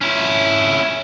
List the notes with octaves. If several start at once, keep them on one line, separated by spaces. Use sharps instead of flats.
C#4 E4